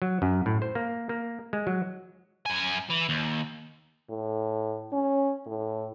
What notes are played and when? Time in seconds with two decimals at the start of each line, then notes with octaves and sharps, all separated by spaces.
0.02 F#3
0.22 F#2
0.46 A2
0.62 C5
0.75 A#3
1.09 A#3
1.53 G#3
1.67 F#3
2.46 F#2 G#5
2.90 E3
3.09 D#2
4.10 A2
4.93 C#4
5.46 A2